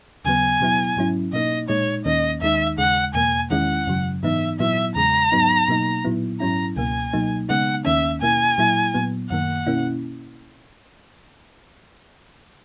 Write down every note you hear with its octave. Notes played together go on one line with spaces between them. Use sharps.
D#2 C#3 F#3 B3 G#5
B2 F#3 B3 E4
G#2 F#3 C#4 E4
B2 A#3 D#4 D#5
A#2 G#3 D#4 C#5
D#2 D#3 A#3 C#4 D#5
D#2 D#3 G#3 D#4 E5
D#2 C#3 G#3 F#5
E2 B2 A#3 G#5
E2 D#3 G#3 C#4 E4 F#5
F#2 C#3 F#3
G#2 E3 B3 D#4 E5
A#2 F#3 B3 E4 E5
E2 C#3 G#3 A#5
G#2 F#3 B3 D#4
B2 F#3 A#3 D#4
A#2 F#3 B3 E4
G#2 F#3 C#4 E4 A#5
C#2 B2 A#3 G#5
B2 F#3 A#3 D#4
C#3 G#3 B3 D#4 F#5
D#2 D#3 A#3 C#4 E5
B2 A#3 E4 G#5
A#2 F#3 A#3 E4
A#2 F#3 B3
F#2 D#3 A#3 F#5
B2 A#3 C#4 E4